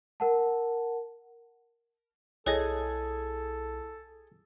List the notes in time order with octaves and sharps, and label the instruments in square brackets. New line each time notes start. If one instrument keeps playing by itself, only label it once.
[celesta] A#4 F#5 A5
[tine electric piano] B1 E4 [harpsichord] G#4 [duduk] A4 [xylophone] C#5 D#5 A#6